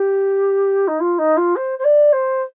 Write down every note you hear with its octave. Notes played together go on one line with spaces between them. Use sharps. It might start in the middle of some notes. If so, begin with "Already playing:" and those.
Already playing: G4
D#4
F4
D#4
F4
C5
C5
D5
C5